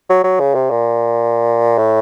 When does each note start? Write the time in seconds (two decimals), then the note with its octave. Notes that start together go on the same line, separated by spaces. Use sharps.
0.10 F#3
0.24 F#3
0.40 C#3
0.55 C3
0.71 A#2
1.78 A2